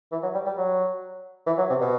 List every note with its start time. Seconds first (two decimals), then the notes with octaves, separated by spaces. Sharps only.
0.12 E3
0.23 F#3
0.34 G3
0.46 G3
0.57 F#3
1.46 E3
1.58 F#3
1.69 C3
1.81 B2